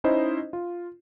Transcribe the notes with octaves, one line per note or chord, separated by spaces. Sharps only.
C#4 D#4 E4 C5 D#5
F4